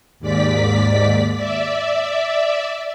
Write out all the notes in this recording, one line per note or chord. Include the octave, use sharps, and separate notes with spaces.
D#2 G#2 D5 B6
D5 E5